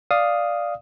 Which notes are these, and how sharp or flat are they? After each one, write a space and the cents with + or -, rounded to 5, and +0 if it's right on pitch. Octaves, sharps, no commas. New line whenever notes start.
D5 +0 F5 +0 D#6 +0